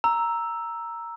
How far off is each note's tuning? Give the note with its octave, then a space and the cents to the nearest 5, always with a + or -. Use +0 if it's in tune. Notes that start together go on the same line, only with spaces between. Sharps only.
A#5 +0 E6 +0